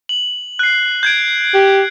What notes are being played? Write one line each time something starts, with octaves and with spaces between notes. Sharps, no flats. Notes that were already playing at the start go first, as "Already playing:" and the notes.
F#7
F#6 C7
G6 G#6 D7
G4